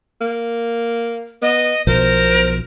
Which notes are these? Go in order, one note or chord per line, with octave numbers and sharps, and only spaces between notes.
A#3
B3 D#5
B1 B2 F3 A#4 C5